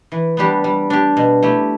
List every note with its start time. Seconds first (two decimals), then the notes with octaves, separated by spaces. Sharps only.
0.12 E3
0.37 G3 B3 D4 G4
0.64 G3
0.90 D4 G4
1.17 B2
1.43 A3 E4 G4